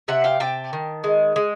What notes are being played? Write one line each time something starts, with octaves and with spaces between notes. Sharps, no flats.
C3 E5 F#5
F5 G5
C3 G5 A5
D#3
G#3
G#3